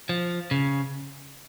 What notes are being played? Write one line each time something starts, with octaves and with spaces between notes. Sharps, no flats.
F3
C#3